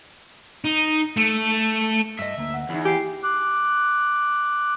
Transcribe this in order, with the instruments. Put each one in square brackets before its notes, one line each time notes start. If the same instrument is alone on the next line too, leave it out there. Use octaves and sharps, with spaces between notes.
[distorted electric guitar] D#4
A3
[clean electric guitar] G2 D#5 [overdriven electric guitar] E5
[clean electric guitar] D2 A#3
[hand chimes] F#5
[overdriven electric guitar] E2 [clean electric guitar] D#4 E4
[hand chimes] E4 D6 C7 [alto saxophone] G4 [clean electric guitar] G#5
[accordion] D6 F#6